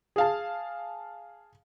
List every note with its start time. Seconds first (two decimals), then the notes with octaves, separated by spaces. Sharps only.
0.16 G#4 F5 A5